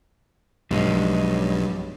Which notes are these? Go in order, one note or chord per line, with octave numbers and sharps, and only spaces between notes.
B1 G2 F3 G#3 C#4